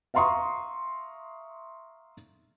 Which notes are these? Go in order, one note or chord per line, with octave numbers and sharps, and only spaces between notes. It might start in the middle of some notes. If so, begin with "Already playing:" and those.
E5 F5 A#5 C6 C#6 D#6